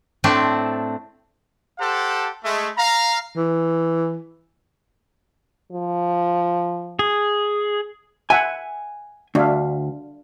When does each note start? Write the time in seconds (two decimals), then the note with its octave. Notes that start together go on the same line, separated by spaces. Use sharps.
0.24 A2 A3 C4 D4 A5
1.79 G4 A4 C5 F#5 A5
2.44 G#3 A3
2.78 F5 A#5
3.37 E3
5.72 F3
6.99 G#4
8.30 E5 F#5 G#5
9.35 D2 D4 E5 F5